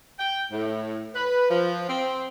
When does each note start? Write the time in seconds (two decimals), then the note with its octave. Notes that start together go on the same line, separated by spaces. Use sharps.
0.19 G5
0.51 A2
1.15 B4
1.50 F3
1.88 C4